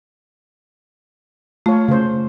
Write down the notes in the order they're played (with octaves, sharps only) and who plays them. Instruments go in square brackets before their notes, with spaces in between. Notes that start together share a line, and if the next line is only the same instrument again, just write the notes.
[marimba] A3 [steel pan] F4 C#5
[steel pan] C#3 C5